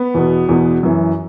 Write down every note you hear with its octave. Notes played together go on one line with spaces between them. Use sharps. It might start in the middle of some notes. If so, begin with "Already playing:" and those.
Already playing: B3
E2 B2
E2 B2
F#2 E3